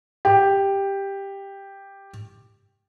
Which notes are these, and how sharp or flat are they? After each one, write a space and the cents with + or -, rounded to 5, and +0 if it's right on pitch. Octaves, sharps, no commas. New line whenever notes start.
G4 +5